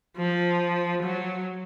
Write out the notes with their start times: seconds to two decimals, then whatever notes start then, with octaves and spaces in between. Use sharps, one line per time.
0.17 F3
1.03 F#3